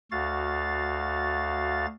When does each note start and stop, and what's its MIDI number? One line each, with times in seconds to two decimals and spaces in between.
0.12 1.86 38
0.12 1.86 66
0.12 1.86 77
0.12 1.86 93